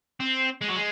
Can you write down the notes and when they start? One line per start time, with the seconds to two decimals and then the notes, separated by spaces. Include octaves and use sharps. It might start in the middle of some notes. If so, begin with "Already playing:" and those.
0.20 C4
0.61 G#3
0.68 F#3
0.76 G#3